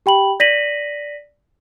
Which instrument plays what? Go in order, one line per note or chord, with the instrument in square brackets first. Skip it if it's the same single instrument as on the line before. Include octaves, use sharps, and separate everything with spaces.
[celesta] G4 G5 B5 F#7
D5 A#6 B6 D#7 F#7